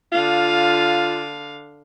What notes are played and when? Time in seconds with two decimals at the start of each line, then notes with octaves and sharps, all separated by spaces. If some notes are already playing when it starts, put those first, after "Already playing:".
0.12 D3 F4 F5